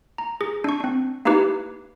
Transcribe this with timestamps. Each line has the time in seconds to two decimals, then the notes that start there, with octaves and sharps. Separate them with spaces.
0.18 A#5
0.41 G#4
0.64 D4 C#6
0.80 C4 D4
1.25 A#3 D#4 E4 G4 B4